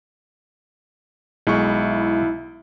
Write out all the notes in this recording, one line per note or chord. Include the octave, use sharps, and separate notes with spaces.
B1 G#3 E4 C#6